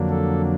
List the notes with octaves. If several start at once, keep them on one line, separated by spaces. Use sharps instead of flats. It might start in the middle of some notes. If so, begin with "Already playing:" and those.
Already playing: F2 D3 F#3 A#3 D4
A4